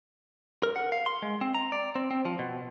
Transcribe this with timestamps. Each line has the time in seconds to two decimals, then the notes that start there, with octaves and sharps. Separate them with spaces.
0.63 A#4
0.76 F#5
0.92 F5
1.06 C6
1.22 G#3
1.41 C4
1.55 A#5
1.72 D5
1.95 C4
2.11 C4
2.25 F3
2.39 B2